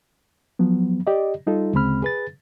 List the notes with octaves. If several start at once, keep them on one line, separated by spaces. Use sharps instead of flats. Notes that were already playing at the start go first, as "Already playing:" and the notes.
F3 F#3 B3
G4 D5 D#5
G3 D#4 F4 A4
D2 C#3 G#3 C4 B5 F6
G#4 B4 A6